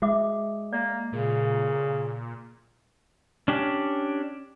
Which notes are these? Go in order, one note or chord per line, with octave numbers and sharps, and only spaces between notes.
G#3 F#4 E5 D6
A#3 D5
A#2 C#3
C#4 D4 G4